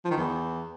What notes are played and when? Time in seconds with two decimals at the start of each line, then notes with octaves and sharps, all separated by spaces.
0.05 F3
0.11 D#3
0.17 E2